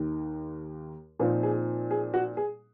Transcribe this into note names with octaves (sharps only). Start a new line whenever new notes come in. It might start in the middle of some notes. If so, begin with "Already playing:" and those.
Already playing: D#2 D#3 A#3 D#4
A#2 F3 C4 D#4 F4
G#4
G#4
F#4
G#4